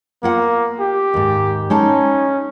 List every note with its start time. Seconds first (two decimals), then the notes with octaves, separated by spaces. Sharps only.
0.23 A#3 B3 F4 F#5
0.80 G4
1.14 D#2 G#2
1.70 G#3 C#4 D#4 A5